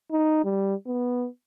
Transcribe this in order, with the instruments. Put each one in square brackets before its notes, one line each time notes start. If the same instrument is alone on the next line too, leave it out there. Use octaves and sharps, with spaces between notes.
[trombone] D#4
G3
B3